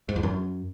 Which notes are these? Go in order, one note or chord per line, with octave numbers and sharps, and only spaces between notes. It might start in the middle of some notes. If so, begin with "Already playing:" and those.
G#2
E2
F#2